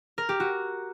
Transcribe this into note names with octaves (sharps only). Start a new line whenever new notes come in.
A#4
G4
F#4